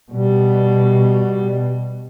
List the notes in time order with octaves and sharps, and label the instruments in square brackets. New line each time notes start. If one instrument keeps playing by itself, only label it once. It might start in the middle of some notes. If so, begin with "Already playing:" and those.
[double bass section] B2 [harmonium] G3